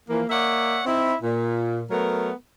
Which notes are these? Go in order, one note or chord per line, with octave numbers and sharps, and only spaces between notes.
E3 F3 A#3
A#3 C#5 D5 E5 F#5
C4 D#4 E4
A#2
F#3 A3 B3 A#4